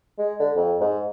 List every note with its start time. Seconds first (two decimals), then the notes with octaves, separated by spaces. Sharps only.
0.19 G#3
0.40 D3
0.56 F2
0.81 G#2